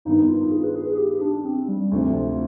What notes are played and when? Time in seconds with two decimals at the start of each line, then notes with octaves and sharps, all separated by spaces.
0.05 G2 D#3 B3 D#4
0.29 F4
0.52 G#4
0.64 B4
0.75 G#4
0.94 G#4
0.98 G4
1.21 D4
1.45 C4
1.69 G3
1.92 D2 C3 F3
2.14 F4